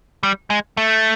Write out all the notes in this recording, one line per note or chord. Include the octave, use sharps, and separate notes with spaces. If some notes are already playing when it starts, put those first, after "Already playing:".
G3
G#3
A3